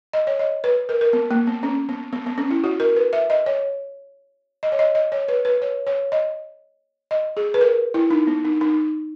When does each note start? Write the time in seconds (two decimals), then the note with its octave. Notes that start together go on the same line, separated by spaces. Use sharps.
0.13 D#5
0.27 C#5
0.39 D#5
0.64 B4
0.89 A#4
1.01 A#4
1.13 B3
1.31 A#3
1.47 B3
1.63 C#4
1.89 B3
2.13 B3
2.26 B3
2.38 C#4
2.51 E4
2.64 F#4
2.80 A#4
2.96 B4
3.13 E5
3.30 D#5
3.46 C#5
4.63 D#5
4.72 C#5
4.79 D#5
4.95 D#5
5.12 C#5
5.28 B4
5.45 B4
5.62 C#5
5.87 C#5
6.12 D#5
7.11 D#5
7.37 G#4
7.54 B4
7.61 A#4
7.94 E4
8.10 D#4
8.27 B3
8.45 D#4
8.61 D#4